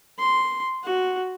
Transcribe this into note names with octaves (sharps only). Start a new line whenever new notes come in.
C6
F#4